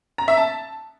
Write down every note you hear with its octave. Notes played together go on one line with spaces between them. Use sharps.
A#5
E5
A5